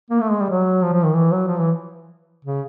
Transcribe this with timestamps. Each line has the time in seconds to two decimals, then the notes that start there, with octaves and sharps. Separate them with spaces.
0.10 A#3
0.21 A3
0.30 G#3
0.41 G3
0.50 F#3
0.83 F3
0.93 F3
1.04 D#3
1.15 E3
1.32 F#3
1.47 F3
1.59 E3
2.45 C#3